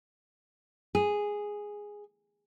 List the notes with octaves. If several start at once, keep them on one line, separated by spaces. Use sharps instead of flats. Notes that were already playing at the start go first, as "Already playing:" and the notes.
G#4